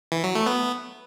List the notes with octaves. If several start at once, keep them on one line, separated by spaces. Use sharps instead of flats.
E3
F#3
A3
B3